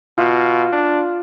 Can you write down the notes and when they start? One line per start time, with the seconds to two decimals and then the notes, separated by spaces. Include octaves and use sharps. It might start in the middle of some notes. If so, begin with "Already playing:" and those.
0.18 B2 F4
0.72 D4